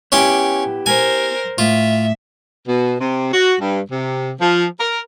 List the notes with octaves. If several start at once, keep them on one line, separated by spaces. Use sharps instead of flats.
B3 C#4 E4 G4 C6 D6
A#4 C5 G#5
A2 F4 E5
B2
C3
F#4
G2
C3
F3
A#4